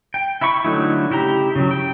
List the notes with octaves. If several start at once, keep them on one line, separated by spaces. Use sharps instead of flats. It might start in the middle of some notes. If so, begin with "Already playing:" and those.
G5
E4 E5 B5 C#6
D3 F#3 A3 D#4 E4
C#3 E4 G4 A#5
C#3 F#3
G5